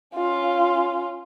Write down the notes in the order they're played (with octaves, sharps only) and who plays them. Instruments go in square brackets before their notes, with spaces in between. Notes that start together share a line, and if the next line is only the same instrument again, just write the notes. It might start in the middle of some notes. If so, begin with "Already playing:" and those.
[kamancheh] C#4 F4